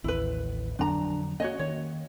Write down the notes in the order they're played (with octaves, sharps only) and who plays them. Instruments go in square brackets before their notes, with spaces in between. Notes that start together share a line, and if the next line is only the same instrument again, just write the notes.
[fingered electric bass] A1 D#2 [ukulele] E4 B4
[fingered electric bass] F2 D3 F#3 [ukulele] D4 A#5
[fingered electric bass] A#3 C#4 [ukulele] F#4 C#5 D#5
[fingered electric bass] D#3 A#3 [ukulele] C#5